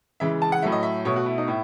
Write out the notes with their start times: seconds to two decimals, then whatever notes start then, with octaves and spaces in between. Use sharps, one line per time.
0.20 C#3 E3 G#3 E5
0.42 A5
0.52 F#5
0.62 A2 F#3 A3 E5
0.72 D#5
0.83 E5
1.05 B2 A3 C#5
1.16 F#4
1.26 E4
1.38 D#4
1.48 A2 E4